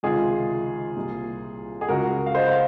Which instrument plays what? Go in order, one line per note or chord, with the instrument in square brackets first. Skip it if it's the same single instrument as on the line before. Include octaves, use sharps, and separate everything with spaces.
[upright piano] C#2 C3 D#3 F4 G#4
C2 A#2
G#4
C#2 C#3 F#4 A#4
F5
C5 D#5
F5